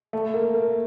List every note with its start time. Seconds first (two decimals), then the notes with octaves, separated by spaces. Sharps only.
0.13 A3
0.34 A#3
0.54 A#3